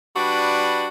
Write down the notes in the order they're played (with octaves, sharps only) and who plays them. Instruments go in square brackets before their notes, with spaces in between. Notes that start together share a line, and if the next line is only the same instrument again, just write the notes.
[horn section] G3 D4 F#4 B4